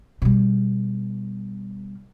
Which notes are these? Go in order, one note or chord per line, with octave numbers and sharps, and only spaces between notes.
B2 G3